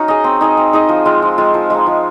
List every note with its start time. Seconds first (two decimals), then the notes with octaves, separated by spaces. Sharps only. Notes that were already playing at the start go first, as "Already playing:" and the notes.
Already playing: C#4 D#4 F#4 C#5 F5
0.08 G#4 D#5
0.24 C4
0.41 D#4 G#4 D#5
0.57 C4
0.73 D#4 G#4 D#5
0.89 F3
1.05 G#3 C4 F4
1.22 F3
1.38 G#3 C4 F4
1.54 F3
1.70 G#3 D#4
1.87 F3